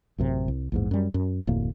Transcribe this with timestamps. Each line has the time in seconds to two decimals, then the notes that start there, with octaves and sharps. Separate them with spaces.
0.18 A1 F#2 C3
0.48 C2
0.72 A#1 E2 G#2
0.91 F#2 G3
1.14 F#2
1.47 F1 D2 A2 A#3